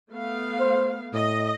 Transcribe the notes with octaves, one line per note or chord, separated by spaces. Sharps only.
A3 B3 F5
C5
A2 D#5